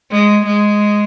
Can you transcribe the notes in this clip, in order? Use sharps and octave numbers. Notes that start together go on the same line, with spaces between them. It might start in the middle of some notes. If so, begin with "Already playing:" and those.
G#3
G#3